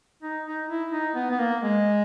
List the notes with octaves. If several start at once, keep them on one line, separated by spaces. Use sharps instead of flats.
D#4
D#4
E4
D#4
B3
B3
A#3
G#3